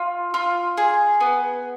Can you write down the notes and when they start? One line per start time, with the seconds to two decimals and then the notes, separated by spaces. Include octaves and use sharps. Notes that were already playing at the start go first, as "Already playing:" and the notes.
Already playing: F4
0.34 F4
0.77 G#4
1.20 B3